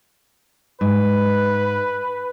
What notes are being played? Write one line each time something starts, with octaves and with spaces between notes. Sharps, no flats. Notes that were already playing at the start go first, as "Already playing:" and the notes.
G#2 B4